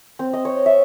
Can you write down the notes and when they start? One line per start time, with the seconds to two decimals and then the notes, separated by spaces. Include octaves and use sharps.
0.19 C4
0.33 D#5
0.45 C#5
0.66 E5